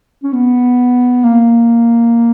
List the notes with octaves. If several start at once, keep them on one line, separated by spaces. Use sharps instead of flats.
C#4
B3
A#3